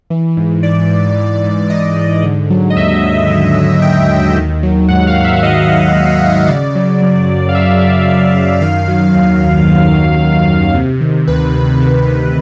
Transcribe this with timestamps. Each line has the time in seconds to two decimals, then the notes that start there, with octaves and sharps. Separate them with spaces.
0.10 E3
0.37 G#2
0.63 E3 D5
0.90 G#2
1.17 E3
1.44 G#2
1.70 E3 D#5
1.96 G#2
2.23 D3
2.50 F#3
2.70 D#5
2.76 D#2 E5
3.03 D#2
3.29 D3
3.56 F#3
3.82 D#2 G5
4.09 D#2
4.36 D#3
4.63 F#3
4.88 G#2 F#5
5.07 F5
5.16 G#2
5.24 E5
5.42 D#3 D#5
5.69 F#3
5.95 G#2
6.22 G#2
6.48 C#3 D5
6.75 F#3
7.02 F#2
7.28 F#2
7.49 F5
7.55 C#3 E5
7.81 F#3
8.08 F#2
8.34 F#2
8.61 D#3 F5
8.88 F#3
9.14 D#2
9.41 D#2
9.67 D#3
9.94 F#3
10.21 D#2
10.47 D#2
10.74 C3
11.01 D#3
11.27 D2 B4
11.54 D2
11.81 C3
12.07 D#3